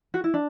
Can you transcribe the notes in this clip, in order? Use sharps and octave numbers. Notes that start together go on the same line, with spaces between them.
F#4
E4
D4